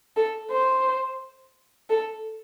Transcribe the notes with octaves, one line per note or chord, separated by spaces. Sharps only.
A4
C5
A4